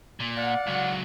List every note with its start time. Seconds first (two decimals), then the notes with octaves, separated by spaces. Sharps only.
0.20 A#2
0.37 D5 F5 F#5
0.66 C#2 F#3